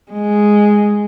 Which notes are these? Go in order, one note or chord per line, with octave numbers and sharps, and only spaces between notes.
G#3